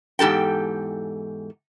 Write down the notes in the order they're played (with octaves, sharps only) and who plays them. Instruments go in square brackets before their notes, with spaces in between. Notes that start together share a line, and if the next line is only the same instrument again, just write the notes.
[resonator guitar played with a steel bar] E2 G#2 G4 A4 G5